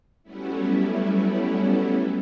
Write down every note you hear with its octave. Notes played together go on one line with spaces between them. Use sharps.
F#3 G3 A3 B3 C#4 E4